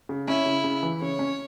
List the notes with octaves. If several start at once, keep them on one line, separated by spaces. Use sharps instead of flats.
C#3
C#4 E4
C#3
C#3
E3
C#3 C#5
C#4